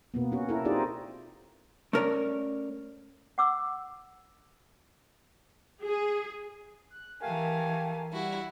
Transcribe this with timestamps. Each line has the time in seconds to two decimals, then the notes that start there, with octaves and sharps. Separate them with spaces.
0.14 B2 A#3 B3
0.32 C#4 F#4
0.49 E4 A4 A#4
0.65 C4 D#4 F4 G4 G#4 D5
1.93 A3 C#4 A#4 C#5 D5
3.38 F#5 D6 E6
5.82 G#4
6.90 F#6
7.21 E3 A3 G4 A#4 F5 G#5
8.12 G3 E4 F#4